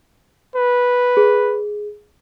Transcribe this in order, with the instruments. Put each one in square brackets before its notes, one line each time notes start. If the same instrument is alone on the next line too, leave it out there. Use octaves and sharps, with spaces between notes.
[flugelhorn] B4
[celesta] G#4